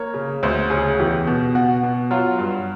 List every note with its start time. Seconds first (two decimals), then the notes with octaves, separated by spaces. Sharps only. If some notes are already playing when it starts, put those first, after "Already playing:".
Already playing: A#3 C#5
0.14 C#3
0.43 D2 C5
0.70 C#3 G#4
0.99 E2 G4
1.27 B2
1.55 B2 F#4
1.83 B2
2.11 F#3 F4
2.38 G2